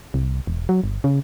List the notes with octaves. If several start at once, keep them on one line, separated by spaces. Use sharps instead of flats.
C2
E1
F#3
G1
C#3